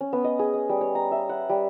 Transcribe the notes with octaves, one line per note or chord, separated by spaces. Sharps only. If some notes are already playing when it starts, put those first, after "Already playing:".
C#4
B3
D#5
G#4
D#5
G3
C#5
A#5
E5
F#5
G3